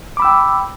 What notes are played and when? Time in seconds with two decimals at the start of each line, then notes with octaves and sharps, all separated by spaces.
0.17 D6
0.20 B5
0.22 E6
0.25 G5